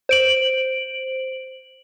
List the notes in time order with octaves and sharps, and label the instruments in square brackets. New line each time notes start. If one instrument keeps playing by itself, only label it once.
[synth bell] C5 D7 F#7